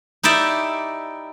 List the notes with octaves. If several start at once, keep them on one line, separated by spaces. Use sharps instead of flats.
D#4 E4 G4 D5 E5